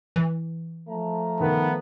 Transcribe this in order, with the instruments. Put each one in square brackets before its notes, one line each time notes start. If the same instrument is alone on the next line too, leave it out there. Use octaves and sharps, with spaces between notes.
[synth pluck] E3
[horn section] F3 A3 A#5
[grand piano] D#3 A#4 [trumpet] B3